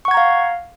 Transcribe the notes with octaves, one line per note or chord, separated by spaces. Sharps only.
F5 F#5 A#5 C#6 G#6